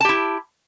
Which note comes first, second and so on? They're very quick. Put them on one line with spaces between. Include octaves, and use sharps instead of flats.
A5 G4 E4